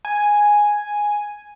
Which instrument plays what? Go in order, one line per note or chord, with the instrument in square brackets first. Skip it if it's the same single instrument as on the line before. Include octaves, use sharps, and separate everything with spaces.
[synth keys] G#5